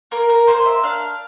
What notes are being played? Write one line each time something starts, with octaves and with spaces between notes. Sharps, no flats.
A#3 A#4
A#4
A#3 C5
E5
D4 F5